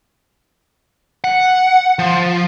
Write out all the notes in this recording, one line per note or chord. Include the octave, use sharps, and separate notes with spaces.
F#5
F3